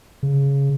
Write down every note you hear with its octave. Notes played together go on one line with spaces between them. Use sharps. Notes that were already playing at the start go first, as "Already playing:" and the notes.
C#3